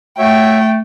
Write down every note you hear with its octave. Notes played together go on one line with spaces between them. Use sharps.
A3 F#4 C#5 E5 G5